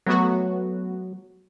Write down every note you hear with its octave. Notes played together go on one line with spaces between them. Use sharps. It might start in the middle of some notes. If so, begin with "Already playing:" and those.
F#3 A3 B3 F#4